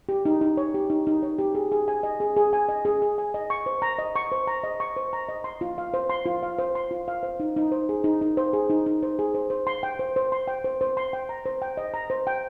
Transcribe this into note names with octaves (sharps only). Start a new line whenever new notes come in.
G4
D#4
D#4
C#5
G4
D#4
D#4
C#5
G4
G#4
G#4
G#5
D#5
G#4
G#4
G#5
D#5
G#4
G#4
G#5
D#5
C#6
C5
A#5
D#5
C#6
C5
A#5
D#5
C#6
C5
A#5
D#5
C6
F4
F5
C5
C6
F4
F5
C5
C6
F4
F5
C5
D#4
D#4
C5
G#4
D#4
D#4
C5
G#4
D#4
D#4
C5
G#4
C5
C5
C6
G5
C5
C5
C6
G5
C5
C5
C6
G5
A#5
C5
G5
D#5
A#5
C5
G5